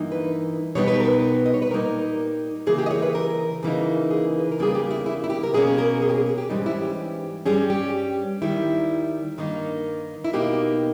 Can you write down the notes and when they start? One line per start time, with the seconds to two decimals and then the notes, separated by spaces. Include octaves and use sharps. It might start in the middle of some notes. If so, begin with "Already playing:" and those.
Already playing: G2 E3 A#3 D#4
0.12 B4
0.75 B2 G3 B3 D#4 C#5
0.87 B4
1.00 A#4
1.12 B4
1.46 D#5
1.54 C#5
1.62 B4
1.71 A#2 G3 A#3 D#4 A#4
2.67 C#3 E3 A#3 G#4
2.78 G4
2.86 D#5
2.91 C#5
3.02 B4
3.15 A#4
3.63 C#3 E3 A#3 D#4
4.11 G#4
4.40 B4
4.52 A#4
4.59 E2 C#3 G3 A#3 G#4
4.75 G4
4.91 E4
5.06 E4
5.24 E4
5.30 G4
5.43 A#4
5.54 B2 A#3 C#4 G#4
5.78 A#4
6.02 G#4
6.10 G4
6.15 G#4
6.26 G#4
6.38 G4
6.49 G#2 E3 G3 C#4 D#4
6.66 E4
6.82 G4
7.46 G2 G3 C#4 G#4
7.70 G4
8.42 D#2 D#3 G3 E4
9.38 G2 D#3 A#3 D#4
10.24 E4
10.33 B2 A#3 D#4 G4